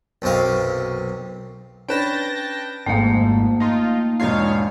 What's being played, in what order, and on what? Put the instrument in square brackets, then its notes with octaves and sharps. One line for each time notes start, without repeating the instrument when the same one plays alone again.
[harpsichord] B1 F#2 C3 D#5 F5
[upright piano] C#4 D4 B4 [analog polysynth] G5 A5 A#6
[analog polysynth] G#1 F2 G#2 [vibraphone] A3 A#3 [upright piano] F5 G5
[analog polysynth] D#4 F4
[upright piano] E1 G#2 F4 [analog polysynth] D#4 C#5 F5